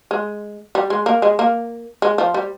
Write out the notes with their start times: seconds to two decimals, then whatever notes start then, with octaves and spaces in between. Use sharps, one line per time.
0.11 G#3
0.75 G3
0.90 G#3
1.06 A#3
1.22 G#3
1.39 A#3
2.02 G#3
2.18 F3
2.34 G3